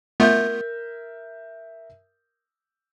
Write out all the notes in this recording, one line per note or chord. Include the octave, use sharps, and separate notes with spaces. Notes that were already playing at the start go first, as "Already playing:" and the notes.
A3 B3 F4 A#4 E5 G6